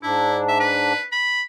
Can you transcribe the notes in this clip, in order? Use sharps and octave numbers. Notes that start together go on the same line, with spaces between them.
G#2 D4 E4
E5
B4
B5